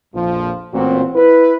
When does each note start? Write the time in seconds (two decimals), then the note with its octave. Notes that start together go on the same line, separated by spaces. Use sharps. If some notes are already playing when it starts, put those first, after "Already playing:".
0.14 A#1 F2 F3
0.74 A1 A#2 C4 F#4
1.15 E4 B4